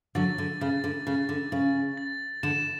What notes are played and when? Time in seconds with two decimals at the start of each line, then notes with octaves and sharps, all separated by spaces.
0.15 D3 F#3 A6
0.38 D3
0.61 C#3 A6
0.84 D3
1.07 C#3 A6
1.29 D3
1.52 C#3 A6
1.97 A6
2.43 D3 E7